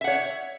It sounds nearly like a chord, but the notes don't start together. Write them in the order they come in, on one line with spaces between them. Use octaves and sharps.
E5 F#5 C#5